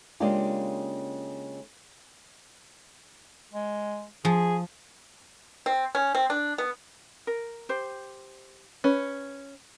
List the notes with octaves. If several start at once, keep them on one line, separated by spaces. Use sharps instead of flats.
C#3 G#3 A#3 D4 F4 G4
G#3
F3 G#4
C4
C#4
C4
D4
B3
A#4
G4 C5
C#4 B4